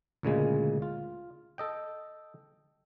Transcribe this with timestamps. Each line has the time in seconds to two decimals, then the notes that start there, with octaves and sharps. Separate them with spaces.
0.23 D2 A#2 C#3 G#3
0.82 F4
1.58 A4 D#5 G5